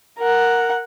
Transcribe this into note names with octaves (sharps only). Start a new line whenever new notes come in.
A#4 F#5